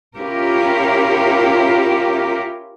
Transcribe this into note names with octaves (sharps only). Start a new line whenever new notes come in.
C#4 E4 F4 G4 A#4